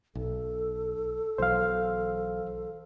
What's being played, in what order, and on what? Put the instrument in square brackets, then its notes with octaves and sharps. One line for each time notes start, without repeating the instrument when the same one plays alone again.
[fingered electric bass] B1 [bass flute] A4
[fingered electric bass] B1 E3 F#3 [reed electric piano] C5 F5